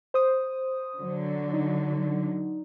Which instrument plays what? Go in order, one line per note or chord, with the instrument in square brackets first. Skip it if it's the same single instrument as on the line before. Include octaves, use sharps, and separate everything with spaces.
[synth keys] C5 D#6
[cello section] D3 F#3
[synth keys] D#4